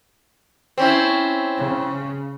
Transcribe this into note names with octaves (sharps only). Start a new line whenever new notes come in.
C4 C#4 E4
C#3